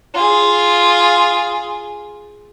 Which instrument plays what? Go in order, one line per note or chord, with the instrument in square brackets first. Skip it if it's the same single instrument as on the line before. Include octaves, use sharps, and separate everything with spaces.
[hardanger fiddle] F4 G#4